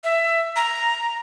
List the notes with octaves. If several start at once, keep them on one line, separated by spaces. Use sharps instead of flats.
E5
A#5